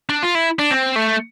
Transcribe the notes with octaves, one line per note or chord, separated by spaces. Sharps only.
D4
F4
E4
D4
C4
A3